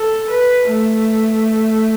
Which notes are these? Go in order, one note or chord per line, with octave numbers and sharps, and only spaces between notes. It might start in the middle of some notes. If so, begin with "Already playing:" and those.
Already playing: A4
B4
A3